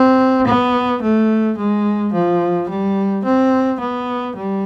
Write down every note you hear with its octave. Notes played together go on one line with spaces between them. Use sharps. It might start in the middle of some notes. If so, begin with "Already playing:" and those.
Already playing: C4
B3
A3
G#3
F3
G3
C4
B3
G3